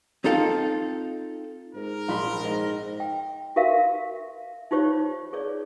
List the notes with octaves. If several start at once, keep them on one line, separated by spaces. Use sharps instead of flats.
C4 D#4 F4 A4 F5 G5
G#2 A#4
A#1 B5 C6
G#2 D#5
G5
F#4 G4 A#4 E5 F5
D#4 F4 G4 C5 C#5
G#4 C#5 D5